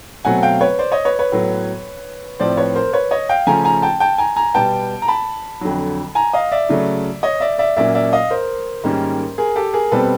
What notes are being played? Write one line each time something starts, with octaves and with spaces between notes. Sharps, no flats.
B2 F#3 A3 C4 F#5 G#5
F5 G5
B4 C#5
C5 D5
C#5 D#5
B4 C#5
B4 C#5
A2 F#3 B3
A2 F3 A3 C4 C5 D5
B4 C#5
A#4 C5
B4 C#5
C#5 D#5
F5 G5
C#3 F3 A3 C#4 G#5 A#5
G#5 A#5
G5 A5
G5 A5
G#5 A#5
G#5 A#5
B2 G3 B3 G5 A5
A#5
A5 B5
F2 D3 F#3
G#5 A#5
D#5 F5
D5 E5
C#3 F#3 A3
C#5 D#5
D5 E5
D5 E5
A#2 F#3 A#3 C#4 D5 E5
D5 E5
D#5 F5
A#4 C5
G#2 D#3 G3 A#3 C#4
G#4 A#4
G4 A4
G#4 A#4
B2 G3 C4 A4 B4